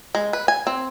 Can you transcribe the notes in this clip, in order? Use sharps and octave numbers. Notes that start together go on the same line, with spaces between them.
G#3
B4
G#5
C4